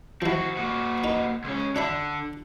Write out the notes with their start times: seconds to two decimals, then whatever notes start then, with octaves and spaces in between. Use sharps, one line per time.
0.22 F3 C4 E4 F#4
0.57 A#3 F#4
1.04 D#4 B4
1.44 C#2 C#4
1.76 D3 D4 E5 B5